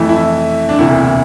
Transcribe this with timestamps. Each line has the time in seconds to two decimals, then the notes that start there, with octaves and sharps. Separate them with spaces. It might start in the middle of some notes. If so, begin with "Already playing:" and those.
Already playing: F2 E3 A3
0.09 E4
0.69 D4
0.79 E1 D2 C3 E3 A#3 E4
1.02 E4